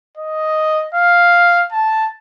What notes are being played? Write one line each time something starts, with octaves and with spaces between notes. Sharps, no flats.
D#5
F5
A5